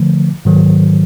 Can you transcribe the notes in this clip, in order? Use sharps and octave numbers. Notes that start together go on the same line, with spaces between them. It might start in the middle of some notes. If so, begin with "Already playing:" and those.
Already playing: D3 F3 A3
G#2 D#3 F#3